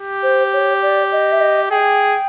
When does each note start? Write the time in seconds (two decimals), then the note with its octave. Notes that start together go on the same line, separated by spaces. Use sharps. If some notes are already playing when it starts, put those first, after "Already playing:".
Already playing: G4
0.23 C5
0.53 C#5
0.82 D5
1.12 D#5
1.32 E5
1.41 D#5
1.70 G#4 G5